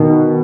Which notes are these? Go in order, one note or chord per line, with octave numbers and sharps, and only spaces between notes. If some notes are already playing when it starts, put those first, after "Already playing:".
Already playing: B2 D#3